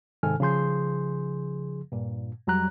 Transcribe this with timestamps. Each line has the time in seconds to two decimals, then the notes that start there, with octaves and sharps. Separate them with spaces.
0.23 G#2 C3 D#3 A4 G#5 F6
0.40 C#3 F3 G#4 C6 G6
1.92 G2 A#2
2.47 F2 F#3 G3 A#5 F#6